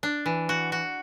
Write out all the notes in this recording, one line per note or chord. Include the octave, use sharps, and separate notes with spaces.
D4
E3
F#4
F#4